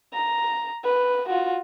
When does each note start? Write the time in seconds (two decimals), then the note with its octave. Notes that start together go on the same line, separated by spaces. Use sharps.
0.13 A#5
0.84 B4
1.29 F4 F#4